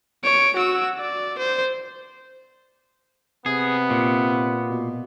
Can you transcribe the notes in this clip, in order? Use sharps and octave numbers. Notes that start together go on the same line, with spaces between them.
C#5 D7
F#4 E6
D5
C5
C3 B3 G#4
A#2
B2